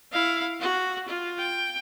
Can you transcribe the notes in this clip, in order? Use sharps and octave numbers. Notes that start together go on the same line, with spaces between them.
E4 F5
F#4
F4
G5